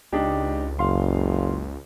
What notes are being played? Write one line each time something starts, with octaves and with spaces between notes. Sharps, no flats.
C#2 D4 D#4 G4
F#1 F5 C6